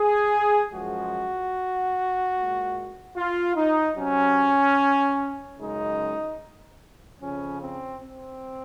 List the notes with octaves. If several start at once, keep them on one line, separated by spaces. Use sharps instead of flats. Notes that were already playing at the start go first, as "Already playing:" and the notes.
Already playing: G#4
F#2 F3 G#3 F#4
A#2 G#3
F4
D#4
C3 F#3 C#4
F#2 C#3 G#3 D#4
F2 C#3 F3 C#4
C4
C4